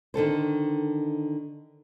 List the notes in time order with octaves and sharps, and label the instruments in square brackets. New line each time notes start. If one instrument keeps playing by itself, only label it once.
[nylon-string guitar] D3 D#3 A4 C5